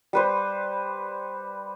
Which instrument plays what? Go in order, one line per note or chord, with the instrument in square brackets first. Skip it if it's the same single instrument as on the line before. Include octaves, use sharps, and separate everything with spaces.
[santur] G3 B4 C5